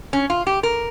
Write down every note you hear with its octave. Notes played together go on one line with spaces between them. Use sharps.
C#4
F4
G4
A#4